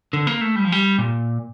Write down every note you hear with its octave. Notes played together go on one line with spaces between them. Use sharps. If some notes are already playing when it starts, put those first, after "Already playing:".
D3
A#3
A3
G3
F3
G3
A#2